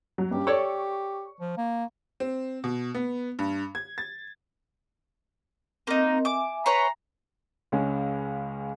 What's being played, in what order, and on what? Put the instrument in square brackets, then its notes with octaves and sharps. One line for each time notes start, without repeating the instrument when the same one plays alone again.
[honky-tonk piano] F#3
[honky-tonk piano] G2 C#4 [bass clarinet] G4
[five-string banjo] A4 C#5 D5 [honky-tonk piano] C#6
[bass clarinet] F3
A#3
[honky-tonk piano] C4
B2
B3
G2
G#6
A6
[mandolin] A#3 D#4 [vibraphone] C4 A#4 D#5
[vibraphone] E5 G#5 [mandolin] D6
[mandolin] B4 C#5 C6 [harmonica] A#5
[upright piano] C#2 G#3 C#4